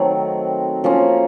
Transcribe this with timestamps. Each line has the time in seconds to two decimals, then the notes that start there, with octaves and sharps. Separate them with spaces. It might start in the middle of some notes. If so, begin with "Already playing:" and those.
Already playing: D#3 F#3 A3 C4
0.84 F3 A#3 C#4